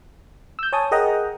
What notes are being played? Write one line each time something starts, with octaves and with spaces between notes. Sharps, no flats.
E6 G6
C#5 G#5 A5 D#6
G#4 A#4 D#5 F#5 G5 A#5